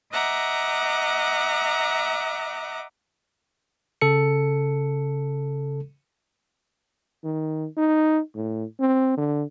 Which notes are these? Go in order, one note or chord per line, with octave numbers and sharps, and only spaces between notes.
D#5 E5 F#5 A#5 D6
C#3 A4 C#7
D#3
D#4
A2
C4
D3